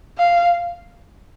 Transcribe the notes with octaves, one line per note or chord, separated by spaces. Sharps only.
F5